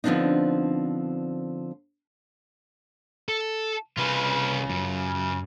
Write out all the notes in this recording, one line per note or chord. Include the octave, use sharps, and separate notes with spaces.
D3 F3 B3 C4 D4 D#4
A4
C2 C#3 F4 B4
F#2